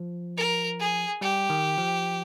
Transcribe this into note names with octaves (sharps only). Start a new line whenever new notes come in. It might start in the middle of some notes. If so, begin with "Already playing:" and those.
Already playing: F3
A#4
G#4
G3 G4
D#3
F3